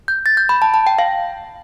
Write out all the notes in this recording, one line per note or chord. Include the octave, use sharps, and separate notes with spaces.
G6
A6
G6
B5
A5
A5
G5
F5